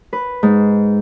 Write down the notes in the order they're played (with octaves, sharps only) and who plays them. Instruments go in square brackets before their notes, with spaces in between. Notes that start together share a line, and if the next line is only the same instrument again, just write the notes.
[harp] B4
G#2